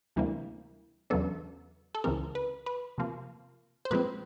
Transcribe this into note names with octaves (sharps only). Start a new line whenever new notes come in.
D2 C3 E3 G3 A#3
E2 C#3 F#3 B3 D4 A4
A4
C#2 C#3 E3 G#3 C4 A#4
B4
B4
C3 F3 A#3
C5
A#2 F3 G#3 C4 B4